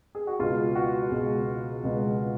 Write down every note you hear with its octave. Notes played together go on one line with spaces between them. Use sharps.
G#4
F#4
C#2 B2 G#3 B3 F4
F#4
C#2 B2 G#3 B3
C#2 B2 G#3 B3